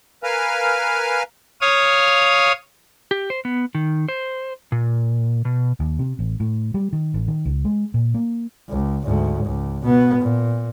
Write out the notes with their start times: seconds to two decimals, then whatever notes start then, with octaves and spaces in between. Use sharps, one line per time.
0.24 A#4 B4 F5 G#5 F6
1.61 C#5 F5 D#6
3.11 G4
3.30 C5
3.45 B3
3.75 D#3
4.09 C5
4.72 A#2
5.45 B2
5.80 D#2
5.99 C3
6.19 A1
6.40 A2
6.74 G3
6.93 D#3
7.14 A1
7.28 D#3
7.46 C#2
7.65 G#3
7.94 A#2
8.14 A#3
8.69 C#2
9.03 D2 G#2
9.45 C#2
9.83 B2 B3
10.19 A#2